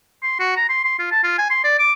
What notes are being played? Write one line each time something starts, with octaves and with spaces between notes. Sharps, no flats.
C6
F#4
A#5
C6
C6
F4
A5
F4
G#5
C6
D5
D6